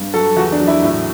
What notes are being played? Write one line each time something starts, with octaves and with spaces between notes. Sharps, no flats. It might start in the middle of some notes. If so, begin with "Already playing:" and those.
Already playing: G2
F#3 A4
E2 F#4
D4
F#3
E4
A2